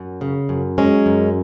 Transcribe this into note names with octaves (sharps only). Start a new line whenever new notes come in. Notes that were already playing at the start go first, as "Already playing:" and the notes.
Already playing: F#2
C#3
F#2
F#3 G#3 C#4
F#2